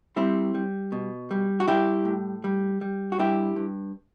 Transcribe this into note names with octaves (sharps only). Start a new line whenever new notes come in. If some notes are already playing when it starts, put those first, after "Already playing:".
G3 C4 E4
G3
B2
G3
F#4
G3 E4 G4
A2
G3
G3
F#4
G2 E4 G4
G2